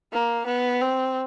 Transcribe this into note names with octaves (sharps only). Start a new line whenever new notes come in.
A#3
B3
C4